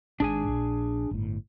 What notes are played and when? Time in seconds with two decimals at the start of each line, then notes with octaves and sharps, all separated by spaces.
0.20 G#1 G#2 D4 G#4 G#5
0.48 A#1
1.11 G1 A2